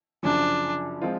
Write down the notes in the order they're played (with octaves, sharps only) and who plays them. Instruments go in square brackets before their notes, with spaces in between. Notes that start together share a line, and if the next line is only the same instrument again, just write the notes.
[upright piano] F#2 C#3 F3 [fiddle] D4
[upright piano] F3 G#3 C4 F4